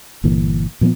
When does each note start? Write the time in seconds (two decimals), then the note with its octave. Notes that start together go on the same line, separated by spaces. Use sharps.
0.24 G1 A#2 E3 A#3
0.81 A#2 F3 G#3 B3